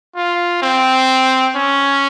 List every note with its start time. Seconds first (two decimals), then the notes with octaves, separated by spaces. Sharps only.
0.16 F4
0.62 C4
1.56 C#4